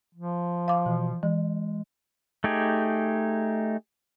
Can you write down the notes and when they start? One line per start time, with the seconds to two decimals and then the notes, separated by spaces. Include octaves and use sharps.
0.15 F3
0.68 F5 D6
0.86 B2 E3
1.23 E3 G#3
2.44 A3 D#4 G4 G#4